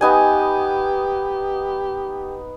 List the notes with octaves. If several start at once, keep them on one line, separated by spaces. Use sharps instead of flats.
B3 D#4 G4 G#5